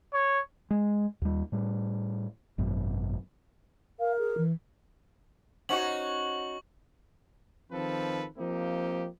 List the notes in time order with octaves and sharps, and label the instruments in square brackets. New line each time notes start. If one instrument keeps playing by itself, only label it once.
[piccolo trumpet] C#5
[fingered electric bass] G#3
D#2 G3
A2 G3
G#1 F#2 B2
[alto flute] A#4 [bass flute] F5
[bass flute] G#4
E3
[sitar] C#4 D#4 F#4 [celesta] C5 F#5 [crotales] C#6 F#7
[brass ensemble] D#3 F3 C4 A4 B4
F3 A#3 C4 D#4 G4